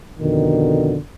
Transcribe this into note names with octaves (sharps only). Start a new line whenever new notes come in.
F2 B2 D3 D#3